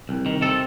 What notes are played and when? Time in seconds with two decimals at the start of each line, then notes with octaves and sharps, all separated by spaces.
0.09 C2
0.26 D#3
0.42 C3 A4